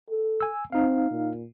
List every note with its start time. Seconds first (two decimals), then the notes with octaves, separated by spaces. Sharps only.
0.10 A4
0.40 G#5 E6
0.72 C4 D#4 F5
1.11 A#2